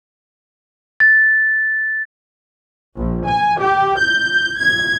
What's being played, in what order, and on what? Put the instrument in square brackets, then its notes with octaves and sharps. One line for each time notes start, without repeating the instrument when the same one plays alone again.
[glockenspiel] A6
[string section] A#1
G#5
G4
G6
G#6